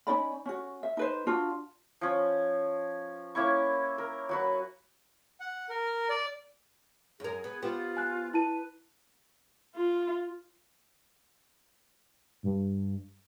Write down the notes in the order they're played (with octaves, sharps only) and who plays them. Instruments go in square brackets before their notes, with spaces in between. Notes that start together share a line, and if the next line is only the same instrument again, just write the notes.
[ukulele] C#4 D#4 D5 B5
C#4 F#4
E5
D#4 B4 C5
D4 F4 F#4
[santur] F3 C#4
A#3 C#4 E4 C#6
A#4
F#3 F#4 B4
[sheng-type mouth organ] F#5
A#4
D5
[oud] F#2 A#4 [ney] G#4
[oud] B3
[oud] B3 G4 C5 [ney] F4
[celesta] G#5 F#6
[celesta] E4 A5 D#7 [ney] B4
[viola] F4
[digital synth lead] G2